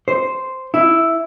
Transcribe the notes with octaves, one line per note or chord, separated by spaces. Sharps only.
C5
E4